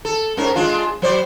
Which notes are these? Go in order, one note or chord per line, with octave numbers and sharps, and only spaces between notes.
A4
G#2 C#4 A#4
G#3 D4 F4
F#3 C5 D5